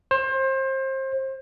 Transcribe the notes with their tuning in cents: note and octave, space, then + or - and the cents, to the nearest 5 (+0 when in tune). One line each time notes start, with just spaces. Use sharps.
C5 +30